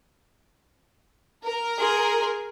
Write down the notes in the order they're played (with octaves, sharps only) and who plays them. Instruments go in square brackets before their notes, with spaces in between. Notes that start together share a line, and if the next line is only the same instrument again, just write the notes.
[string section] A#4
[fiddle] G#4 C6